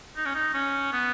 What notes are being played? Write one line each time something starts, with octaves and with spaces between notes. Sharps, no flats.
D#4
C#4
D#4
C#4
B3